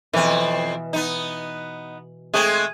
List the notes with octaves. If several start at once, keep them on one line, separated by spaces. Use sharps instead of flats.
F2 B2 E3 C4
B3 D#4
G#3 A3 C4 G#4